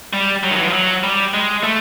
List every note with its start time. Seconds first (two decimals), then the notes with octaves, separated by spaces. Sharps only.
0.13 G3
0.44 F#3
0.51 D#3
0.58 E3
0.67 F3
0.73 F#3
1.03 G3
1.34 G#3
1.64 A3